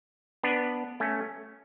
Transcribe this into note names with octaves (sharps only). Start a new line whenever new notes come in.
B3 D4
A3 C#4